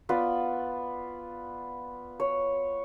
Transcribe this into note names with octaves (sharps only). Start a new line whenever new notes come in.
B3 F4 B4 D5
C#5